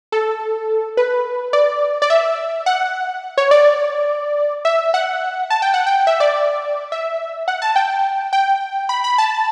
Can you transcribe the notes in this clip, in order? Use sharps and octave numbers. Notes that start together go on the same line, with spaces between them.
A4
B4
D5
D5
E5
F#5
C#5
D5
E5
F#5
A5
G5
F#5
G5
E5
D5
E5
F#5
A5
G5
G5
B5
B5
A5